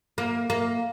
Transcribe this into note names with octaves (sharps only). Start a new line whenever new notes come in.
A#3
A#3